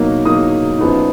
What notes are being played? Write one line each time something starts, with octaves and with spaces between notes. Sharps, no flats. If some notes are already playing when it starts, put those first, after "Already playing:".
Already playing: B2 F#3 A#3 D#4
B2 F#3 A#3 D#4 D#6
F#2 F3 B3 D#4